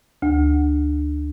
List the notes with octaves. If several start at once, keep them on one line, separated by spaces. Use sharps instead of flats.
D2